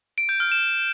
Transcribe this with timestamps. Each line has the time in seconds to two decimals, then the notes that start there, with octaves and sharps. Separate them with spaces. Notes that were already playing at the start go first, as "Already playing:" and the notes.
0.18 D7
0.29 G6
0.40 F6
0.52 E7